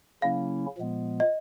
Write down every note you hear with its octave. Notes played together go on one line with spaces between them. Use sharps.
C#3 F#3 A#3 C#4 E4 F5
A#2 F3 G#3 B3
D#5